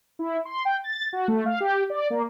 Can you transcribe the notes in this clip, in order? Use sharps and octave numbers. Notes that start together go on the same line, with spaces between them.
E4
C6
G5
A6
F#4
A3
F5
G4
D5
A#3